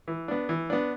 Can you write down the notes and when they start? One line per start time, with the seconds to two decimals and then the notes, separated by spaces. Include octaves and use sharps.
0.08 E3
0.28 B3 D4
0.49 E3
0.70 B3 D4